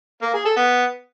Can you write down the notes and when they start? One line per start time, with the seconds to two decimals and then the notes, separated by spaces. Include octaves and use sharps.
0.22 A#3
0.34 G#4
0.45 A4
0.57 B3